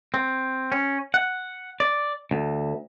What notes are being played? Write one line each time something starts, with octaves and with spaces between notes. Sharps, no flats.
C4
C#4
F#5
D5
D2